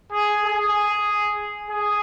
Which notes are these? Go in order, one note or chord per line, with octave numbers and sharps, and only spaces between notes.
G#4
G#4
G#4